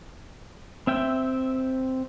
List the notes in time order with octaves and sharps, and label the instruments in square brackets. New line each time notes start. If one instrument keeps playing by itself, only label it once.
[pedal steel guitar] C4 E5 G5